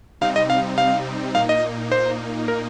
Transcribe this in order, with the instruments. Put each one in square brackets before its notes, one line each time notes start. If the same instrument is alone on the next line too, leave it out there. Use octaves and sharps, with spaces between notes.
[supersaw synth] C3 G3 C4 D#4 [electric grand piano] F5
[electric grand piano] D#5
F5
F5
[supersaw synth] A#2 A#3 D#4 [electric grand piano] F5
[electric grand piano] D#5
C5
A#4